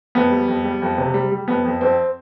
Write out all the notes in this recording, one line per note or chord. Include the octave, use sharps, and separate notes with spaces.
F2 B3
G3
F2
G3
F2
C3
G3
G3
F2 B3
F2
F2 C4